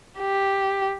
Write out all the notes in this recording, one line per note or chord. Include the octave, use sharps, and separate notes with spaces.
G4